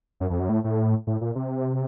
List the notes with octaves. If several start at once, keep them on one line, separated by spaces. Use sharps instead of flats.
F#2
F2
F#2
A2
A2
A2
A#2
C3